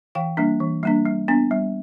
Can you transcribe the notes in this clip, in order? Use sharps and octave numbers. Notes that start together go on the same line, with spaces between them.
E3 F5 G5
G3 A#3 D4
E3
G3 A#3 D4
G3
B3 D4
G3